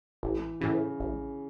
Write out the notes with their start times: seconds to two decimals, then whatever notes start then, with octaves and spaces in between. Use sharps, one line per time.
0.23 A1 E3
0.61 A2 C#3 E3
1.00 A1